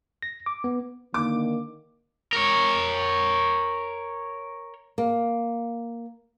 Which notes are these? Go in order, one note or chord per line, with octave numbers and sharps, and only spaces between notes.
A#6
D6
B3
D3 D#3 A#3 D6
A#4 C#5
A#3